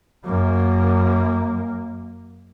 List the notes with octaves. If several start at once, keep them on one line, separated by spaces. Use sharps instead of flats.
F#2 A#3